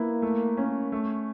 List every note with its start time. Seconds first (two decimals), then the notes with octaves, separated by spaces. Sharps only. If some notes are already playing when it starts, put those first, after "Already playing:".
Already playing: A#3 B3 E4
0.22 A3
0.57 C#4
0.92 A3